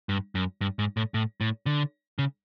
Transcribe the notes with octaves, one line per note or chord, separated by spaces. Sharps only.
G2
F#2
G2
G#2
A2
A2
A2
D3
C#3